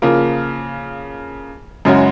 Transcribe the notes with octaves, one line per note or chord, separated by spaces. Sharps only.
C#3 F3 A#3 F4 A#4
F#2 C#3 G#3 C#4 F#4